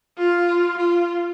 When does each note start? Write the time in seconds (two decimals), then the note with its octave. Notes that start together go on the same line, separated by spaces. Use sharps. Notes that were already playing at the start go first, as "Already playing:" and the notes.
0.18 F4
0.77 F4